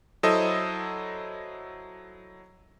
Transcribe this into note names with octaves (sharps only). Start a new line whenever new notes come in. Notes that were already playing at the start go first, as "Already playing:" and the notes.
F#3 E4 A4 C5 D#5 D#6